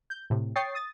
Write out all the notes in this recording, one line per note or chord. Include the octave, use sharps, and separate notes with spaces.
G6
A2 C3
C#5 G5 C#6 D#6 A6 C7
D#6 A6